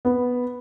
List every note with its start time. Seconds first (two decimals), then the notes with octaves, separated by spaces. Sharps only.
0.05 B3